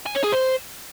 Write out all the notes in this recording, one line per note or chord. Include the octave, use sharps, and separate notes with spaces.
G#5
C#5
G#4
C5